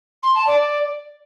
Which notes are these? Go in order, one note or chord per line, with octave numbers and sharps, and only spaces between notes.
C6
A5
D5